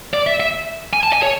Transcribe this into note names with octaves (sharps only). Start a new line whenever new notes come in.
D5
E5
E5
G#5
A5
G#5
C#5